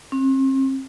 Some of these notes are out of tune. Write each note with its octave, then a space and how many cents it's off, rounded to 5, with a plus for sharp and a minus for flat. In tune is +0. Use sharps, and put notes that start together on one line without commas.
C4 +40